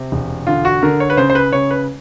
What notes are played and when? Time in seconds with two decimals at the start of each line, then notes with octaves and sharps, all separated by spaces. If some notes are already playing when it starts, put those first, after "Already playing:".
Already playing: C3
0.12 E1
0.47 D3 F4
0.65 F#4
0.83 D3 A#4
1.00 C#5
1.10 B4
1.17 C#3 C5
1.30 C5
1.35 B4
1.52 C#3 C#5
1.71 B4